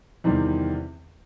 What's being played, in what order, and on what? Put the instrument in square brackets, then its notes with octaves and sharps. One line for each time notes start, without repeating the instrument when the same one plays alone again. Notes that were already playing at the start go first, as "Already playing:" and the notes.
[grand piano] E2 C3 D#3 G3 C4